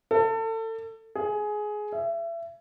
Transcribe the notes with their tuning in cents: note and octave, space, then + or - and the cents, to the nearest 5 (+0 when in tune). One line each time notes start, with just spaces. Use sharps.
A4 +30
G#4 +15
E5 +30